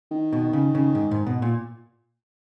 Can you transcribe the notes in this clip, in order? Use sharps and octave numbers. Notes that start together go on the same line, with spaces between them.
D#3
B2
C#3
C#3
G#2
G#2
B2
A#2